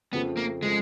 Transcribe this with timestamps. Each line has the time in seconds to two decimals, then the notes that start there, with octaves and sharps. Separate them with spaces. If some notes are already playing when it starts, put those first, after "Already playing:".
0.13 F2 C#3 F3 A3 B3
0.37 A#3
0.62 C#3 F3 G#3 A3